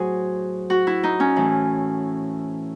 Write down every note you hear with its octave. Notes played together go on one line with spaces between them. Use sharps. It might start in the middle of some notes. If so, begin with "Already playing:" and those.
Already playing: A2 F#3 F#4 G#4 C5
F#4
E4
D#4
C#4
A2 E3